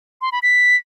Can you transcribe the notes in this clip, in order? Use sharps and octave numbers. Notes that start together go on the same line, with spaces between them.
C6
B5
B6